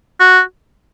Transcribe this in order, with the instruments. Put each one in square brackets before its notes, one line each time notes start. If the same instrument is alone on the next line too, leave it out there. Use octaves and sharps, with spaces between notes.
[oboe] F#4